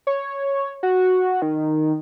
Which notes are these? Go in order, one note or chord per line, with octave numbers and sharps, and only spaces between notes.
C#5
F#4
D#3